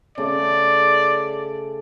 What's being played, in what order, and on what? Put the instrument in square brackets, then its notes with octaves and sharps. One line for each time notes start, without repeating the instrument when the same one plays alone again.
[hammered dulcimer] C#3 A3 [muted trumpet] D5